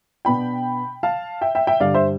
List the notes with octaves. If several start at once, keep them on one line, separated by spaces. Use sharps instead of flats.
B2 B3 D4 G5 B5
F5 A5
E5 G5
E5 G5
E5 G5
G2 D3 G3 D5 F5
C5 E5